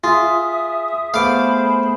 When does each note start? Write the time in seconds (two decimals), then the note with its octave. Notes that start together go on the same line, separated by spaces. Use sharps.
0.04 F4 G#4 E5 D#6
1.14 A3 B3 G#4 C5 F5 B5 D6